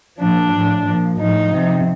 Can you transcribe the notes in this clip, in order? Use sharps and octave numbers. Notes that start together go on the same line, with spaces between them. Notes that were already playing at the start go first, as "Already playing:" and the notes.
A#2 F3 D4
A2 F3
A#2 F3
A2 F3 D#4
C3 F3